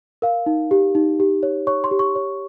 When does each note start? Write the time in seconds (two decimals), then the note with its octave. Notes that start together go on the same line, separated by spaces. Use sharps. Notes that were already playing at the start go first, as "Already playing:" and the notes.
0.22 A#4 F5
0.46 D#4
0.71 G4
0.95 D#4
1.20 G4
1.43 C#5
1.67 C#5 C#6
1.84 C6
1.91 G4
1.99 C#6
2.16 C#5